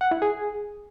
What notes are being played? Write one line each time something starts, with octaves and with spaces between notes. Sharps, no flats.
F#5
E4
G#4